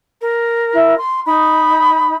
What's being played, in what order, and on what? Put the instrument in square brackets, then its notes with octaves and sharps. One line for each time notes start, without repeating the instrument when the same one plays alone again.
[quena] A#4
[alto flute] E4
C6
[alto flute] D#4 [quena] B5